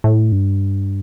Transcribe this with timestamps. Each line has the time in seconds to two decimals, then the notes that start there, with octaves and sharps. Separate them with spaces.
0.04 A2
0.32 G2